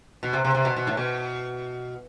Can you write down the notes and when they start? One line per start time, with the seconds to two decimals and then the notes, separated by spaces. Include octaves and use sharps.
0.23 B2
0.33 C3
0.45 C3
0.55 C3
0.65 B2
0.76 B2
0.87 A2
0.97 B2